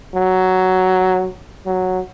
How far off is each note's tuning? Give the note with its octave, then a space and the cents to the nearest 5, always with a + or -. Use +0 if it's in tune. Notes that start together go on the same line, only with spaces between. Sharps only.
F#3 +5
F#3 +0